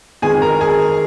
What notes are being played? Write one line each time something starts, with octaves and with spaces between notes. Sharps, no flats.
F2 D#3 G#3 B3 G#4 G#5
A#4 A#5
G#4 G#5